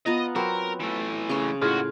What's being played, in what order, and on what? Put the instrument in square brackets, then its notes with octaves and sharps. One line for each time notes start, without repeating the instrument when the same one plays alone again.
[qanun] B3 F4 A#5 [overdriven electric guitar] D#5
[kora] F#3 C4 [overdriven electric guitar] A#4 [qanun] B4
[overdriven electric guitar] E3 A3
[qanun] C#3 C#5 C6
[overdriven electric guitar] D#2 F#4 [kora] A2 F4 G#4